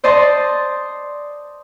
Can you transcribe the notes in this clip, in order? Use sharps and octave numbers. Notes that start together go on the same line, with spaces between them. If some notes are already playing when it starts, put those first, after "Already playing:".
C5 D5 D#5 A5 C6